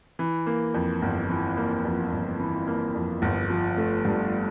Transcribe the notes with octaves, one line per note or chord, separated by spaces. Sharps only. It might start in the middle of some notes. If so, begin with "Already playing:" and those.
E3
A#3
F2
G1
E3
A#3
F2
G1
E3
A#3
F2
G1
F3
A3
G2